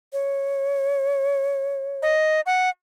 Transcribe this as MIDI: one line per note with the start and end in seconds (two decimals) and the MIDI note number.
0.13 2.15 73
2.02 2.41 75
2.46 2.69 78